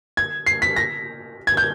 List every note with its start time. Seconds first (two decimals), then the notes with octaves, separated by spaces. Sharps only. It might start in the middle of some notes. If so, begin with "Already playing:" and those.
0.17 G#6
0.46 C7
0.62 B6
0.76 A#6
1.47 G#6
1.57 G6